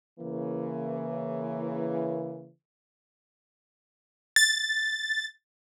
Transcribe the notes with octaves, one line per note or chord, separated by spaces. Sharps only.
C#3 E3 A#3
A6